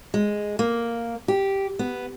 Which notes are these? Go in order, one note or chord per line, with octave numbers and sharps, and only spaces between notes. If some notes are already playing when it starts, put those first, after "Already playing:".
G#3
A#3
G4
B3